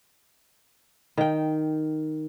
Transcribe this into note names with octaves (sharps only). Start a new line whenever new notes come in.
D#3 G5